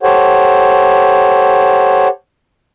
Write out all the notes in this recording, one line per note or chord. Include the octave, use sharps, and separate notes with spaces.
G4 A4 C5 C#5 F#5